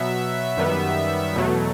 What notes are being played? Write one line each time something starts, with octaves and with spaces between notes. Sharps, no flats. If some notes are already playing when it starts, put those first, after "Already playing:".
Already playing: B2 F#3 B3 E5
F#2 D#3 G3 B3
E2 B2 F#3 A3